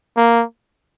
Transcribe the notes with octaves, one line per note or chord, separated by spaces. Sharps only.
A#3